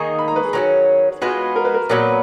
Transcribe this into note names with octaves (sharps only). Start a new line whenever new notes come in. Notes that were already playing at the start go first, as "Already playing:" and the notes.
Already playing: D#3 A#3 D#4 G#4 C#6
B5
A#5
B4
G#4
D#3 F#3 C#4
G#3 B3 F4 F#4
A#4
B4
A#4
A#2 F#3 B3 A#4